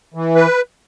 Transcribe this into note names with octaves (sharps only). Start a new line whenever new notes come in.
E3
B4